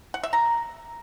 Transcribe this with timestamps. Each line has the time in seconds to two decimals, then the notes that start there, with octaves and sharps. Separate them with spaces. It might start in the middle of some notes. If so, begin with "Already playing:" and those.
0.14 F#5
0.23 E5
0.33 A#5